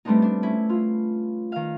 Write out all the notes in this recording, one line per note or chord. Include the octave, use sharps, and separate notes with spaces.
G3 A3 B3 C4 D4 D#4
D4
C#4 E4
F4
D#3 F5